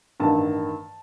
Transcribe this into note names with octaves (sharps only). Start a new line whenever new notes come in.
A1 G2 D#3 A5